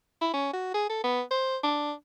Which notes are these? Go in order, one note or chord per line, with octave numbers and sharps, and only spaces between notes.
E4
C#4
F#4
G#4
A4
B3
C5
D4